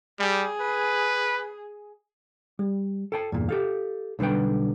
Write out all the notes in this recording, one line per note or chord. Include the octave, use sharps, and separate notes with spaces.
G3 G#4
B4
G3
A4 G5 A5
E2 G2 A#2
G4 A4 F5
B1 D3 G3 B4 G5